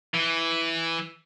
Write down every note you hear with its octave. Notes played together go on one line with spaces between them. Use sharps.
E3